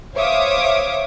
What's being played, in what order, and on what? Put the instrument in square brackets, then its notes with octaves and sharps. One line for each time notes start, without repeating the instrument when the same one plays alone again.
[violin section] C5 C#5 E5 F5 D6 D#6